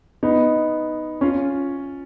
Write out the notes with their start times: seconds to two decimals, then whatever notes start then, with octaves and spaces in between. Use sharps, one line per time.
0.23 B3 D#4
1.21 C#4 F4